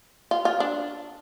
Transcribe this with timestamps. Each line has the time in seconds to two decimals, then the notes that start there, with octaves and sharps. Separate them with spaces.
0.31 F4
0.45 F4
0.60 D4